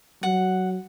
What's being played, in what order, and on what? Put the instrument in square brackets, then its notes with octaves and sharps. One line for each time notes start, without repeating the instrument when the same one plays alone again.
[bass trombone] F#3 [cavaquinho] F#5